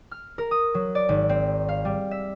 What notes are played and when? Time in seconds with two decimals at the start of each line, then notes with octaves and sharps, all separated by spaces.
0.11 F6
0.38 A#4
0.51 D#6
0.74 F#3
0.95 D5
1.09 G#1
1.29 C4
1.69 F5
1.85 G3
2.11 E5